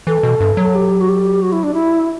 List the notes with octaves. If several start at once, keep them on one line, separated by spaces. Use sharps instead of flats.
E3 A4
B2
G2
F#3
A4
G4
F#4
G4
F#4
E4
D4
E4